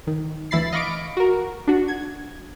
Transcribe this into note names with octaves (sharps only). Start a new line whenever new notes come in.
D#3
D2 E3 E4 B5 A6 C7
D#5 F5 B5 C#6 D6 D7
F#4 A#4
D4 F#4
G#6